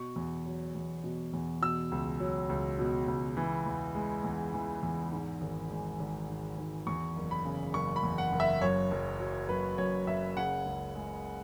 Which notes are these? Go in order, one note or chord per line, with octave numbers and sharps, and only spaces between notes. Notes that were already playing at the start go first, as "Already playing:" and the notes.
Already playing: B2 C#6
E2
F#3
E2
B2
E2
B2 E6
C#2
F#3
C#2
B2
C#2
E3
E2
G#3
E2
E3
E2
G#2
G#1
G#3
G#1
G#2
G#1
E2 C#6
F#1
B5
C#3
F#1 C#6
B5
E2
F#5
F#1
E5
F#2 C#5
F#1
F#3
F#1 B4
F#2 C#5
F#1 E5
C#3 F#5
C#2
G#3